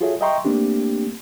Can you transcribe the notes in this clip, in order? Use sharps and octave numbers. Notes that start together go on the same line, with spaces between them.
F4 F#4 G#4 A4 C#5 E5
D#5 E5 G5 A#5 C6 C#6
A3 A#3 C4 D4 G4